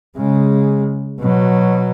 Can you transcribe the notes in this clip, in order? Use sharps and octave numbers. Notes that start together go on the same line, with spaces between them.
C#3 G#3
B2 F#3